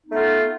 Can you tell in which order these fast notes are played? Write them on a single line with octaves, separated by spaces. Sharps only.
D#4 B3 A3 F4